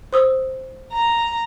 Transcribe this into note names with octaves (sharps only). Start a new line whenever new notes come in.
C5 D#6 E6
A#5